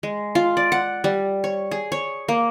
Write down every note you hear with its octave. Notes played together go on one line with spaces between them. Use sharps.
G#3
F4
D5
F#5
G3
C#5
G#4
C#5
A#3